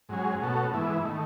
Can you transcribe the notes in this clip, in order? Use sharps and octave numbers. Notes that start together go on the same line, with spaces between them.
G#2 F#3 C#4 G#4
B2 A3 C#4 F#4 A4
G#2 E3 B3 E4
D#3 A3